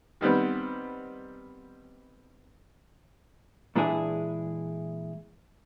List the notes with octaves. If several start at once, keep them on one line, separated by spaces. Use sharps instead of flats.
D#3 G3 B3 C4
A#2 E3 G#3 D4 E4 G#4